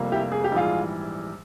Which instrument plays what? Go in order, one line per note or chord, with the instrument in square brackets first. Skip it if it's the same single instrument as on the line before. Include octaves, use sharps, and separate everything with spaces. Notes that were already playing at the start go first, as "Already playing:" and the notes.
Already playing: [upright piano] F1 F2 C3 G3 A#3
E4 G4
G#4
G4
A#1 G#2 E3 G3 F4 G#4